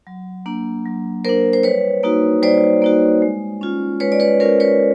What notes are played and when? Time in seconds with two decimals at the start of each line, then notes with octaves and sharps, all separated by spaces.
0.07 F#3
0.46 A#3 D4
0.86 F#3
1.24 A#3 D4 A#4 C5
1.53 C5
1.63 G3 B4 C#5
2.03 A#3 D#4 F#4
2.42 G3 C5 D5
2.82 A#3 D#4 F#4
3.22 G#3
3.61 C#4 F4
4.00 G#3 B4 C#5
4.12 D5
4.20 B4 C#5
4.40 C#4 F4 A#4 C5
4.60 B4 C#5